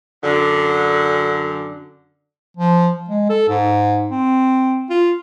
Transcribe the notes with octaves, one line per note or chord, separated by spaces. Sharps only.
F#2 D3
F3
G#3
A4
G#2
C4
F4